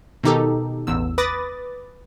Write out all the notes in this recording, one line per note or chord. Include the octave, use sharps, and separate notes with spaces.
B2 D#3 D#4 G4 A4
A1 E2 E6
B4 B5 D6 D#6 A6 A#6